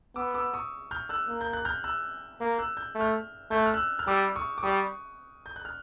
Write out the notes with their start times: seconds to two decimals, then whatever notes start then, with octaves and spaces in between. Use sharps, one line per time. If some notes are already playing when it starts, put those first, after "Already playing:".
0.16 B3 D6 E6
0.34 D6 E6
0.54 C#6 D#6
0.91 F6 G6
1.09 E6 F#6
1.27 A#3
1.41 G6
1.53 F#6
1.65 F6 G6
1.84 E6 F#6
2.40 A#3
2.59 E6 F#6
2.77 G6
2.95 A3
3.01 F6 G6
3.51 A3 G6
3.58 F#6
3.66 F6
3.73 E6 F#6
3.99 F6
4.07 G3 D6 E6
4.36 C#6 D#6
4.58 D6
4.63 G3 C#6 D#6
5.46 G6
5.56 F#6
5.65 F6